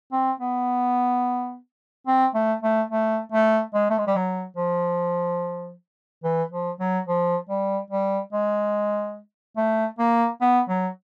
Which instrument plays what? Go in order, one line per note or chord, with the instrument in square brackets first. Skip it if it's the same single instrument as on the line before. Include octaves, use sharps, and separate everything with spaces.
[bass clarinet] C4
B3
C4
A3
A3
A3
A3
G#3
A3
G#3
G3
F#3
F3
E3
F3
F#3
F3
G3
G3
G#3
A3
A#3
B3
F#3